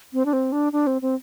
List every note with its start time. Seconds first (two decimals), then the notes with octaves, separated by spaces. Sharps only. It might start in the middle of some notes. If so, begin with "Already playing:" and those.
0.13 C4
0.25 D4
0.33 C4
0.52 D4
0.72 D4
0.87 C4
1.02 C4